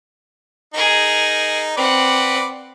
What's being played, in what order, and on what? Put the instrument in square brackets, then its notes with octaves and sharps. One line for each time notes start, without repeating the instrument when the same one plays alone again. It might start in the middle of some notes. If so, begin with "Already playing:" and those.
[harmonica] D#4 [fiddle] G#4 A#4
[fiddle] C4 F#5 [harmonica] B4 D5